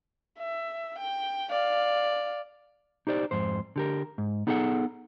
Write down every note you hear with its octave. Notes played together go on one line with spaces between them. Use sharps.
E5
G5
D5 F5
D#4 G4 C5 D5
F2 G#2 C5
D3 G4 A#4
G#2
B3 D#4 G#4 A4 E5 F#5